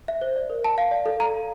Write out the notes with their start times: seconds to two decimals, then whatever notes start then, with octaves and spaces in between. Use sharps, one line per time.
0.08 E5
0.21 C5
0.36 D5
0.50 A#4
0.64 A5
0.78 F5
0.91 D5
1.06 A4
1.20 A#5
1.34 F5